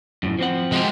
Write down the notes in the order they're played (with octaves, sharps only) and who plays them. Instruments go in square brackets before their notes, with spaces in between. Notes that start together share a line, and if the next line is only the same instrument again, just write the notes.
[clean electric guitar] F#2 A2
F3 C4 F#5
[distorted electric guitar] G#3 G5